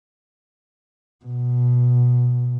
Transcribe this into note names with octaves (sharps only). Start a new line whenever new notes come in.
B2